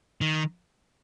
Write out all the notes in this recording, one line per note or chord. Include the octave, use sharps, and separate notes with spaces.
D#3